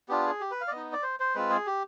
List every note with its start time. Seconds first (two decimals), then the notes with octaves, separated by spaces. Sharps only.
0.09 B3 D4 F4 G4
0.25 G#4
0.40 G4
0.51 B4
0.61 F5
0.68 D5
0.71 B3 D#4 D#5
0.93 D5
1.03 C5
1.20 C5
1.35 G#3 C4 F4 B4
1.50 G#4
1.66 G4